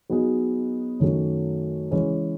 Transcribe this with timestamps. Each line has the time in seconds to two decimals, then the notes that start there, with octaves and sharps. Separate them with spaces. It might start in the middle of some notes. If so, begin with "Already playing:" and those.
0.09 F#3 B3 D#4 G#4
1.00 F#2 D#3 A3 C#4 F#4
1.91 C#3 E3 G#3 C#4 G#4